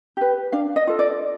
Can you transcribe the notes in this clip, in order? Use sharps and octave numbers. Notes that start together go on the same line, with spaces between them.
G4 B4
D4 F5
D#5
F4 A4
D5